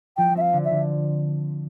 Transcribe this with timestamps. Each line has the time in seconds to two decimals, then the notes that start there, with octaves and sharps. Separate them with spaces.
0.17 F3 G5
0.35 C4 E5
0.41 F5
0.53 D3
0.65 E5
0.71 D3